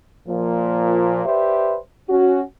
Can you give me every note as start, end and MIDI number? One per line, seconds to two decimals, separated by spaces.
0.28 1.25 46
0.28 1.25 53
1.25 1.77 67
1.25 1.77 71
1.25 1.77 72
1.25 1.77 74
1.25 1.77 76
2.09 2.41 61
2.09 2.41 66